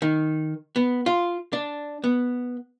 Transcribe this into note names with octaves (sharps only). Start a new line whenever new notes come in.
D#3
B3
F4
D4
B3